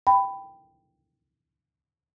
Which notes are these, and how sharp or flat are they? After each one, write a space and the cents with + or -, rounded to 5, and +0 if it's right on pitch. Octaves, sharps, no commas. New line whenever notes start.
G5 +0 B5 +10